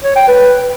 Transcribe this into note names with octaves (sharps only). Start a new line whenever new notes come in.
C#5
G5
B4